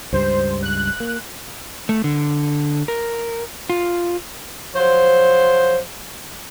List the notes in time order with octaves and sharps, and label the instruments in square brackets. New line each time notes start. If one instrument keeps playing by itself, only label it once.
[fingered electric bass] C#2 G2 G3 [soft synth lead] C5
[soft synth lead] F#6
[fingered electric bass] A#3
[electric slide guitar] A3
D3
A#4
F4
[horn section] F3 F#3 C5